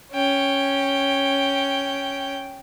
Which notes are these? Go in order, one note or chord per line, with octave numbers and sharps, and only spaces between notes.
C#4 G5